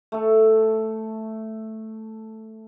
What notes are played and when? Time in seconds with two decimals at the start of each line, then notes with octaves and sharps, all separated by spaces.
0.12 A3 A4